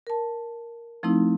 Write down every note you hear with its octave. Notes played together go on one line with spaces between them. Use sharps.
A#4 A5
F3 A3 C4 D#4 E4